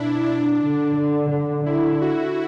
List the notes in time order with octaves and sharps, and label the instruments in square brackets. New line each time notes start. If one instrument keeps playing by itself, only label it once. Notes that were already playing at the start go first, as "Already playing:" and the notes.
Already playing: [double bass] B2 [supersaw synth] D4 E4
[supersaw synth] D4
[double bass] D3
D3
D3
[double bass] D3 [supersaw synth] E4
[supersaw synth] F#4